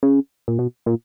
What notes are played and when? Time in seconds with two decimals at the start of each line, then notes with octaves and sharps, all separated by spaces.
0.03 C#3
0.48 A#2
0.59 B2
0.86 A#2